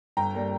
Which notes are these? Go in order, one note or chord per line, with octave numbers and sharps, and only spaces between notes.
G1 G5 A#5
G3 A#3